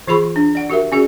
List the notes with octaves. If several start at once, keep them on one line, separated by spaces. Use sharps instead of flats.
E3 F4 G#4 B5 C#6
D4
D5 F#5
F#4 G4 A#4 E5
C#4 F#4 G#4 D5